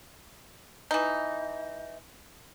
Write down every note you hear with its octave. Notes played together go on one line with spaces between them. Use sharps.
E3 D#4